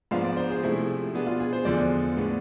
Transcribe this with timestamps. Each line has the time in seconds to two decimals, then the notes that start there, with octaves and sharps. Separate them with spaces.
0.11 G#2 F3 B3 D4 F5
0.24 D5
0.37 C5
0.50 G#4
0.63 C3 F3 A3 E4 G#4
1.14 B2 B3 D4 G#4
1.27 F4
1.40 G#4
1.53 C5
1.65 E2 D3 F3 G#3 D5
2.17 A2 G#3 B3 D4